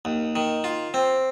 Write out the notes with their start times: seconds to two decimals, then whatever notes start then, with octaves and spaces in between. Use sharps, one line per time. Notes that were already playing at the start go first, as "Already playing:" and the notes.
0.05 D#2
0.36 D#3
0.64 F4
0.94 C4